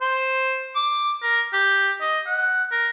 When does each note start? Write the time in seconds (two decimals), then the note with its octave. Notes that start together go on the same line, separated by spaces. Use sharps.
0.01 C5
0.75 D6
1.23 A#4
1.53 G4
2.01 D#5
2.26 F#5
2.71 A#4